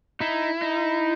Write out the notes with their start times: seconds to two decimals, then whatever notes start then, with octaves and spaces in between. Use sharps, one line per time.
0.20 D#4 E4
0.62 D#4